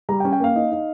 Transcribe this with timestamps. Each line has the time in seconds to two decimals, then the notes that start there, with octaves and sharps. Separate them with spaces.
0.09 G3 A#5
0.20 G5
0.25 C#4
0.33 G5
0.40 A#3 F5
0.56 D#4
0.71 D#4